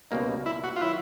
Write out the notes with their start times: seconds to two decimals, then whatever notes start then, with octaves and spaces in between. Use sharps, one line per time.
0.11 C#2 B2 G3 A#3 D#4
0.46 E4
0.64 F#4
0.76 F4
0.81 D#3 F#3 E4